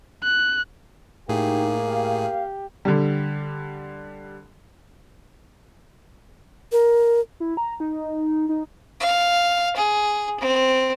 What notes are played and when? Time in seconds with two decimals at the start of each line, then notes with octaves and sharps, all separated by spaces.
0.23 F#6
1.29 A2 A#3 D#4 G4 G#4
1.89 G4 F5
2.85 D3 G3
6.72 A#4
7.40 E4
7.57 A#5
7.80 D#4
8.49 D#4
9.00 F5
9.76 G#4
10.40 C4